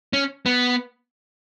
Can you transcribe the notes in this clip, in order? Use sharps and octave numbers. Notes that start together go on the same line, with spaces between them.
C#4
B3